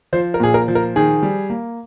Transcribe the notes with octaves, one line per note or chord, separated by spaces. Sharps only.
F3 C5
A#4
A#2 G#4
A#4
F3
A#4
D#3 G#4
G3
A#3